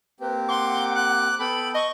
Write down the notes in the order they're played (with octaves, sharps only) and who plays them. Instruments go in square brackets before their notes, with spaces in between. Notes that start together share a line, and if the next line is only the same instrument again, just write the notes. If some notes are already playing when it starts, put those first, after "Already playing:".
[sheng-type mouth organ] A#3 C4 G4 [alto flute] B4
[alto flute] F#5 [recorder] C6 [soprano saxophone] D6
[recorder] F#6
[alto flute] B3 [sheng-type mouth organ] A4 G5 [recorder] B5
[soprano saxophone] D#5 [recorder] C#6